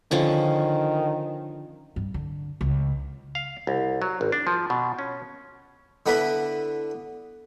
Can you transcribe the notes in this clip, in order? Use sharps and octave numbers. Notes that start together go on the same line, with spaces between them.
D3 D#3 F3 C#4
G2
D3
C#2
F5
C2
F#3
G#1
D4
F3
B2
C#4
D3 B3 D4 E4 B4 B5